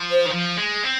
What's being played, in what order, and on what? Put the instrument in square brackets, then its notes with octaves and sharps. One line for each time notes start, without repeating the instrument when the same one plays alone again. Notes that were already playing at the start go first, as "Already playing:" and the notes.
Already playing: [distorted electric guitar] F3
[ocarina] C5
[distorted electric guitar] D#3
F3
G#3
C4